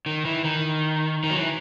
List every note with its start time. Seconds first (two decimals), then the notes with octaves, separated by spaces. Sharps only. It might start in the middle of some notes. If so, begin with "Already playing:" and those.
0.06 D#3
0.25 E3
0.44 D#3
1.24 D#3
1.30 F#3
1.36 E3